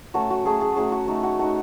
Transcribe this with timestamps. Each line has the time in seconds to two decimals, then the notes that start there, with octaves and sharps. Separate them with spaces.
0.14 F#3 A3 C#4 F#4
0.30 F#4
0.45 F#3 A3 C#4 G#4
0.61 G#4
0.76 F#3 A3 C#4 G#4
0.92 F#4
1.08 A3 D#4
1.23 F#4
1.39 A3 D#4 F#4